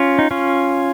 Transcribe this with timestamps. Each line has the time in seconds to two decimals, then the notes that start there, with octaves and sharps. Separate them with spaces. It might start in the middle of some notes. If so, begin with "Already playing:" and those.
Already playing: C#4 F4
0.19 D#4
0.31 C#4 F4